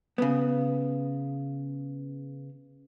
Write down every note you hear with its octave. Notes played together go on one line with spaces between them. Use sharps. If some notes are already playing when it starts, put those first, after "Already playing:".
C#3 B3